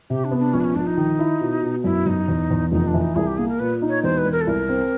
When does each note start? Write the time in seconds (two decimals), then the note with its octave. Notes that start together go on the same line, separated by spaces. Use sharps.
0.10 C3 G4
0.25 D4
0.32 B3
0.39 D4
0.54 A#1 C#4
0.60 D4
0.64 C#4
0.76 A#1 D4
0.87 D#4
0.97 D#3
1.19 E4
1.41 B2
1.63 B2
1.84 F#2 E4
2.06 F#2 D#4
2.28 E2
2.51 E2
2.72 F1 D#4
2.87 D4
2.94 E3
3.01 D#4
3.16 C2 G#4
3.27 G4
3.38 A#3 G#4
3.49 A#4
3.60 A#2 B4
3.82 D#4
3.89 C#5
4.03 E1 C5
4.18 B4
4.26 E1
4.32 A#4
4.41 A4
4.47 C2 A#4
4.69 C4